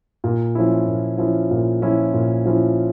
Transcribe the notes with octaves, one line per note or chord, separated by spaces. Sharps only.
A#2
F3 C#4 E4
A#2
F3 C#4 E4
A#2
F3 C#4 E4
A#2
F3 C#4 E4